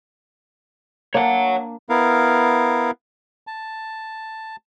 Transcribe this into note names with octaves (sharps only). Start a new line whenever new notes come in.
A#3 D4 C#5 F#5
B3 E4 A#4 F5
A5